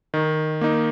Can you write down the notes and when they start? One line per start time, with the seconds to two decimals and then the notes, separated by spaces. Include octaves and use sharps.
0.14 D#3
0.61 A#3 D#4